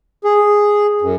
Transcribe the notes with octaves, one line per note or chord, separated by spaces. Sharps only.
G#4
F#2